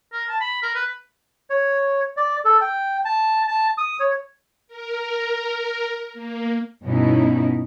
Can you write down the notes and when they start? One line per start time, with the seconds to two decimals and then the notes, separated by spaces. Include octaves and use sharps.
0.13 A#4
0.29 A5
0.41 B5
0.62 A#4
0.75 B4
1.50 C#5
2.17 D5
2.45 A4
2.61 G5
3.05 A5
3.47 A5
3.78 D#6
4.00 C#5
4.67 A#4
6.13 A#3
6.84 G2 B2 B3 C#4 D#4 E4